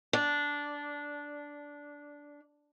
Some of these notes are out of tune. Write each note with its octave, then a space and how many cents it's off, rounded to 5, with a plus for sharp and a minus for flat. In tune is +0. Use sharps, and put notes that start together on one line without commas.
D4 -10